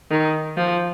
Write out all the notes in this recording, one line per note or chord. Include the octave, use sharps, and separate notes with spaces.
D#3
F3